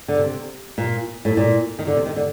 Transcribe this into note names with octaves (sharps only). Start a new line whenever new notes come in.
D3
C3
A#2
A2
A#2
D#3
D3
C3
D#3
D3